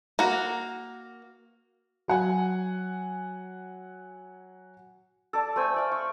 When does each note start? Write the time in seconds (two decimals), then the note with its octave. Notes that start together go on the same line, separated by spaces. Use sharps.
0.19 A#3 F#4
2.08 F#3 F#5 G#5
5.33 A4 D5 A5
5.56 A3 C5 G#5 E6
5.74 A3 D5 F5
5.92 C#6